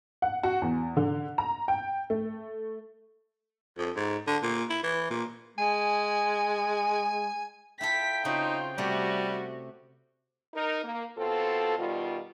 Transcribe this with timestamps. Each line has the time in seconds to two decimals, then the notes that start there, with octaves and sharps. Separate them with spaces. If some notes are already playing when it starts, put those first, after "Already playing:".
0.22 F#5
0.43 F#4
0.62 E2
0.97 D3
1.38 A#5
1.68 G5
2.10 A3
3.78 F2
3.96 G#2
4.27 D3
4.43 A#2
4.70 E4
4.83 E3
5.11 A#2
5.58 G#3 G#5
7.81 E4 F4 A4 G5 B6
8.25 C#3 C4 D#4 F4 F#4
8.78 C3 G3 A3 F#4 A4
10.55 D#4 A#4
10.84 A#3
11.17 B2 C4 F4 A4
11.79 B2 D#3 G3 F4